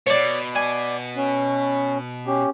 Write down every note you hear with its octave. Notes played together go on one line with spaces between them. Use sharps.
B2 C#5 D5
D5 G#5
C#4
C#4 G4